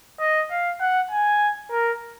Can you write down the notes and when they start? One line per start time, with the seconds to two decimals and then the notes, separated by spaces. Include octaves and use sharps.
0.20 D#5
0.50 F5
0.80 F#5
1.11 G#5
1.71 A#4